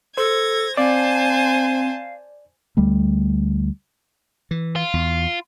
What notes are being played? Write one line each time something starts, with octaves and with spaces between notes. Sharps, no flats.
A4 C5 G#6 A#6
C4 C5 D5 F5 G#5 A5
D2 G3 A3
E3
F4
E2